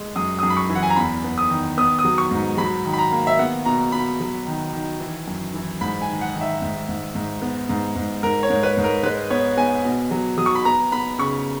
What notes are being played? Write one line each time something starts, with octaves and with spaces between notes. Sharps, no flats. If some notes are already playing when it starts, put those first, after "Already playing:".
Already playing: G#3
F#2 D#6
F#2 D#6
B5
C#6
E3
F#5
G#5
A#5
E2 B5
B3
D#6
D#3
B3 D#6
D#6
F#3
C#6
G#2
F#3 B5
D#3
B5
A#5
A#3
E5
B3 F#5
B2 A#5
B2 B5
F#3
D#3
D#3
E3
F#2
E3
G#2 B5
G#5
D#3
F#5
D#3
E5
G#2
G#2
G#2
B3
G#2
G#2
G#2 A#4
C#5
G#2
B4
G#2
A#4
G#3 B4
B3 C#5
B3 G#5
B2
F#3
F#3 D#6
C#6
B5
B3 A#5
B3 B5
C#3 C#6